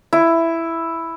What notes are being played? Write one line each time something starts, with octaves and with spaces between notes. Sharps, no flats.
E4